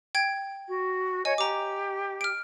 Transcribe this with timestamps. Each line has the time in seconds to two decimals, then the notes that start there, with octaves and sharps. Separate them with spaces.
0.15 G5 G#6 D7
0.68 F#4
1.25 C#5 D#5 G#5
1.38 G4 A#5 D6
2.21 F6 D7